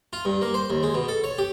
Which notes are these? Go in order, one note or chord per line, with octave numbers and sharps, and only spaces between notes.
F4
G2
A#3
C5
D#2
G#3
B2
A4
C#5
G4